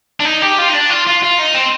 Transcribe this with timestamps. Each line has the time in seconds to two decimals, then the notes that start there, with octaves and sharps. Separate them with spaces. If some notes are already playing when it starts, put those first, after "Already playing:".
0.20 D4
0.25 D#4
0.42 G4
0.58 F4
0.69 D#4
0.73 D4
0.90 F4
1.07 F4
1.23 F4
1.38 D#4
1.54 C4